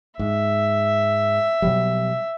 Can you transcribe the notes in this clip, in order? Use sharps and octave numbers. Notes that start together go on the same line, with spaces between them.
G#2 E5
B2 F#3 G3